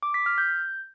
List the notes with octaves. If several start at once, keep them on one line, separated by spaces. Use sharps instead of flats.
D6
B6
F6
G6